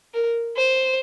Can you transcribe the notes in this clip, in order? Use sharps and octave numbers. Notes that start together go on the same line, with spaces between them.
A#4
C5